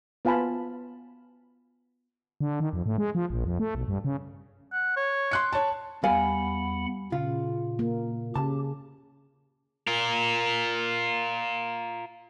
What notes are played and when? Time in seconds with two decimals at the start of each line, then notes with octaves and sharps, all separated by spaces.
0.25 B3 F4 F5 G#5 A5 B5
2.41 D3
2.60 D#3
2.73 F2
2.86 A2
2.98 G#3
3.15 F3
3.30 A#1
3.45 F2
3.60 A3
3.75 B1
3.88 G2
4.05 C#3
4.73 F#5
4.97 C#5
5.31 C6 F#6 C#7
5.53 C#5 A5
6.04 E2 G3 F5 F#5 G#5 B5
7.12 A#2 C#3 F4
7.79 A#3
8.36 C#3 G4 A5
9.87 F4 A#4